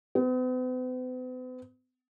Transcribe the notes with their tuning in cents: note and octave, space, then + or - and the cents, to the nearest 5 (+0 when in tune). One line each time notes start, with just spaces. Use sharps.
B3 +45